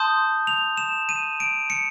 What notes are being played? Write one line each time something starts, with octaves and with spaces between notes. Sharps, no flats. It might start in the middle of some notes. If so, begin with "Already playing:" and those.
Already playing: A5 C6 D#6 G6
F7
E7
D#7
D7
C#7